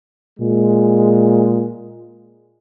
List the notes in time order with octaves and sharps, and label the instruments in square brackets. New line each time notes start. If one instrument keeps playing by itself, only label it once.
[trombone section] A#2 G#3